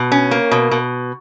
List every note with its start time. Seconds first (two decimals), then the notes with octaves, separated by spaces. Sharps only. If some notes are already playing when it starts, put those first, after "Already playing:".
Already playing: B2
0.12 C#4
0.31 A#3
0.51 B2
0.71 B2